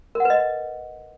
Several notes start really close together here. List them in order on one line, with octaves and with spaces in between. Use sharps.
A#4 F#5 B4 D#5